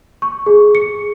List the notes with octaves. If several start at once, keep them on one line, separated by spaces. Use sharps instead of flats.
C#6
G#4
C#7